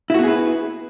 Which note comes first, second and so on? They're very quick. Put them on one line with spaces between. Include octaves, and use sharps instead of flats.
E4 F#4 B3 G#4 B4